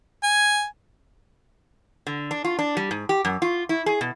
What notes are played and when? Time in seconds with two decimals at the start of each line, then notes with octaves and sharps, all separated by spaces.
0.23 G#5
2.07 D3
2.31 D4
2.45 F4
2.59 D4
2.77 G3
2.91 G#2
3.09 G4
3.25 F#2
3.42 F4
3.69 E4
3.86 G#4
4.01 B2